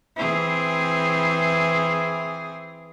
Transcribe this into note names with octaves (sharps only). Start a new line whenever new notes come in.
E3 C4 G#4